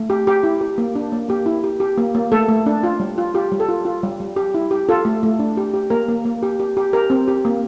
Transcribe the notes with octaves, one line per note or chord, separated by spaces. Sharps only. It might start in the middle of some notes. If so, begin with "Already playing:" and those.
Already playing: A3
G4
G4
E4
G4
A#3
D4
A#3
A#3 G4
E4
G4
G4
A#3
A#3
A3 A4
A3
D4
F4
G3
F4
F4 G4
G3
A4
F4
F4
G3
G3
G4
E4
G4
F4 A4
A3
A3
D4
G4
G4
A#3 A#4
A#3
A#3
G4
G4
G4
G4 A#4
C4
G4
A#3